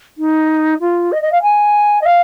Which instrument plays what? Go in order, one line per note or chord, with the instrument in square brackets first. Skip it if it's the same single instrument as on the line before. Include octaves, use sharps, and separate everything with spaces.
[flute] D#4
F4
D#5
D#5
F5
G#5
D#5
F5